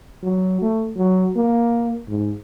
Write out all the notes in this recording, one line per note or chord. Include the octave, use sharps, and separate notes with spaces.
F#3
A3
F#3
A#3
G#2